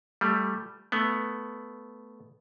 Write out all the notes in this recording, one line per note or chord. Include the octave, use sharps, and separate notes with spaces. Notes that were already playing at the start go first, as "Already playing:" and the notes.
G3 A3
A3 B3